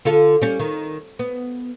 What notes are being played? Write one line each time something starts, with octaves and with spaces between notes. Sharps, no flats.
D3 F4 A4
G3 C#4
D#3
B3